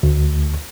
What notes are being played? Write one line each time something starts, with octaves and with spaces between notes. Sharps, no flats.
D2